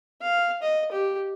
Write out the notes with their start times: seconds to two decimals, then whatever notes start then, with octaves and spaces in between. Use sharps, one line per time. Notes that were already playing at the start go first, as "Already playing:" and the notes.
0.22 F5
0.62 D#5
0.92 G4